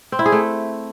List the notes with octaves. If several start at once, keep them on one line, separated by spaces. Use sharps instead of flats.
C4
E4
G#4
A3